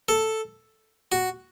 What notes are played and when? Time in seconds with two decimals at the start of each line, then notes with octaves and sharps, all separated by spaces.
0.09 A4
1.12 F#4